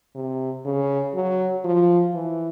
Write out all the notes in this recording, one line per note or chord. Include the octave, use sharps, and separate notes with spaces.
C3
C#3
F#3
F3
E3